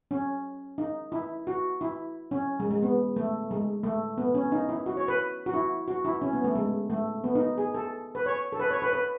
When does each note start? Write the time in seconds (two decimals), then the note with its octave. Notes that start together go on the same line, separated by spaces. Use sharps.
0.11 C#4
0.78 D#4
1.12 E4
1.47 F#4
1.81 E4
2.31 C#4
2.60 G#3
2.71 G#3
2.83 B3
3.16 A3
3.51 G#3
3.84 A3
4.18 B3
4.35 C#4
4.52 D#4
4.69 E4
4.86 F#4
4.97 C#5
5.08 B4
5.46 F#4
5.54 E4
5.88 F#4
6.05 E4
6.22 C#4
6.33 B3
6.44 A3
6.55 G#3
6.90 A3
7.24 B3
7.35 D#4
7.58 G#4
7.74 A4
8.15 B4
8.26 C#5
8.52 A4
8.59 B4
8.71 C#5
8.82 B4
8.93 B4